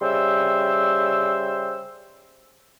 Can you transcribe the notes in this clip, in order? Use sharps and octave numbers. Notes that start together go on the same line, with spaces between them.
C#3 G3 C5 E5 C6 E6